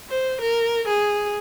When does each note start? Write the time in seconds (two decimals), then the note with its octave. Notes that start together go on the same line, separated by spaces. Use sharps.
0.10 C5
0.41 A#4
0.88 G#4